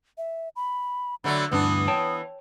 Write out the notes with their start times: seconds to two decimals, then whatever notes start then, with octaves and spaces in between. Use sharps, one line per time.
0.18 E5
0.56 B5
1.24 D3 F#3 A3 B5
1.52 D2 G2 E3 B3 D4 D#6
1.88 C#5 G5 A5